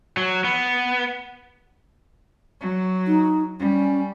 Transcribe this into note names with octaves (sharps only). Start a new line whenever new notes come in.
F#3
B3
F#3
D#4
G3 C#4